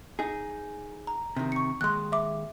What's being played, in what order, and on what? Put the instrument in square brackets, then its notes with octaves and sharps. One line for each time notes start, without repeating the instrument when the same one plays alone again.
[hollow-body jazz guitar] D#4 G#4
[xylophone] A#5
[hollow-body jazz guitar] C3 D#3
[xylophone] C#6 C#7
[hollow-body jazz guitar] D#2 G#3 [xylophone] C6 F#6
[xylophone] E5 D6